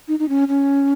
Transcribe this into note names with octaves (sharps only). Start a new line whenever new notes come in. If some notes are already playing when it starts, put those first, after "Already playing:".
D#4
D#4
C#4
C#4